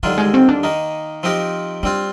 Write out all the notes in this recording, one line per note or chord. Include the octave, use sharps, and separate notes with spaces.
D#2 D3 F3 G3 A#3 F4
G#3
C4
D4
D#3 A#3 D#4
F3 C4 D#4 G4 A#4
G3 C4 D4 F4